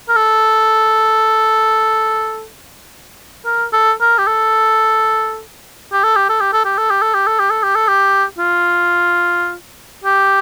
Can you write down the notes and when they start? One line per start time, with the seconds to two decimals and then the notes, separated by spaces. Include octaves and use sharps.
0.09 A#4
0.16 A4
3.45 A#4
3.73 A4
4.01 A#4
4.18 G4
4.27 A4
5.92 G4
6.04 A4
6.16 G4
6.29 A4
6.40 G4
6.53 A4
6.65 G4
6.78 A4
6.90 G4
7.02 A4
7.14 G4
7.27 A4
7.39 G4
7.50 A4
7.63 G4
7.75 A4
7.88 G4
8.38 F4
10.04 G4